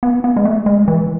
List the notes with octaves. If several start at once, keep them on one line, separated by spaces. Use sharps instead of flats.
B3
B3
G#3
A3
G#3
E3